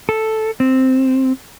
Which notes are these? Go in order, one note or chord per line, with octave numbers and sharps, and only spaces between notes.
A4
C4